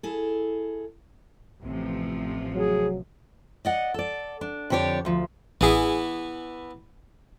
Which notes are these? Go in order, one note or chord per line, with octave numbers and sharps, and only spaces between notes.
E4 G#4 A4
A1 C3 F3
F#3 G#4
D5 D#5 F#5
A4 D5
D4
F2 D3 G4 C#5 D5
D2 F3
A1 E3 B3 E4 G#4